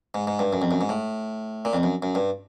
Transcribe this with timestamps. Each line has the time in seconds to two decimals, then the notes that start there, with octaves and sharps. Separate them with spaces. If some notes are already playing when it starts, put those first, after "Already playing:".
0.14 G#2
0.27 G#2
0.39 G2
0.53 F#2
0.62 F2
0.71 F#2
0.81 G#2
0.89 A2
1.65 A#2
1.73 F2
1.83 F#2
2.02 F#2
2.15 G2